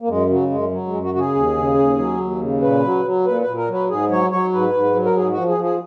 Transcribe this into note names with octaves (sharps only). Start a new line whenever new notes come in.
A#3
F#2 G#3
C#3 F#3
F#2 G#3
F#3
G#3
F#2
F#4
C#3 F#4 G#4
D#2
C#3
D#2
F#3
D#2
C#3
A#2 B4
F#3
F#3
A#2 B4
B4
A#2
A#4
F#3
B4
G#2 G#4
F#3 C#5
F#3 C#5
G#2 B4
G#2
F#3
A#4
G#2 G#4
F#4
F3
G#4
F3
G#4